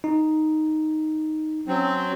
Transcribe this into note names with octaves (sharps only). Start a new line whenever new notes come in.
D#4
F#3 C4 C#4